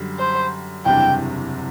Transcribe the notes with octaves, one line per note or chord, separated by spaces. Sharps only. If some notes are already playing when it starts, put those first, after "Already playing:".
Already playing: F#2 D3 G3
C5
F#1 E2 C3 G3 D4 G5